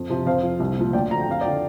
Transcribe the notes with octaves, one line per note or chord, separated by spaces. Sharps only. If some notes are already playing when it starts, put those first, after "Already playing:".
Already playing: F2
C3 F3
F2 C5 F5
F3
C2
A#2 F3
D2 D5 G5
D3 F3 A#5
G5
F2 F5
D5 G5
D3 F3